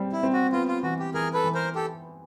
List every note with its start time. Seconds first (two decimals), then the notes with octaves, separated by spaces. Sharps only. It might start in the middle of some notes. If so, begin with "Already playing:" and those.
Already playing: G3 C4
0.12 E4
0.23 C4
0.33 F#4
0.52 B3 F4
0.68 F4
0.83 E3 F#4
0.99 G4
1.14 E3 G#4 A#4
1.34 A4 B4
1.44 E3
1.54 A#4 C5
1.75 G4 A4